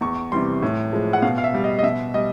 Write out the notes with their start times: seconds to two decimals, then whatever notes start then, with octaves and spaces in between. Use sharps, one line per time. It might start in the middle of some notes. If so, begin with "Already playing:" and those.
0.01 E2 C#6
0.32 C3 E3 G3 C6
0.62 A2
0.93 F3 G#3
1.13 F#5
1.22 B2 F5
1.38 F5
1.44 E5
1.54 G3
1.64 D#5
1.79 D#5
1.83 B2 E5
2.14 G3 D#5